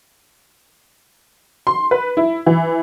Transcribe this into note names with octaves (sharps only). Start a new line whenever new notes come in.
C6
B4
E4
E3